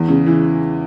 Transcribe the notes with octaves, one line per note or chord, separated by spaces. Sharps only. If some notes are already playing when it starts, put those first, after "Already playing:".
Already playing: E2
C#3
E3